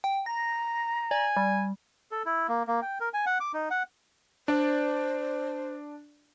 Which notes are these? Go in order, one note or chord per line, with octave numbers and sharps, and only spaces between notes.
G5
A#5 A#6
D5 G#5
G3
A4
E4
A#3
A#3
G5
A#4
G#5
F#5
D6
D#4
F#5
D4 C5 D5